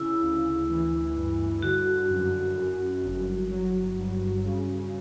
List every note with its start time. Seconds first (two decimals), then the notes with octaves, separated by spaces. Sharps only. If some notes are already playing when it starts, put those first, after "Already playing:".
Already playing: C#3 E4
0.22 D2
0.70 E3
1.16 G2
1.62 D3 F#4
2.10 F#2
2.57 F#2
3.03 G1
3.51 F#3
3.98 G2
4.44 C#3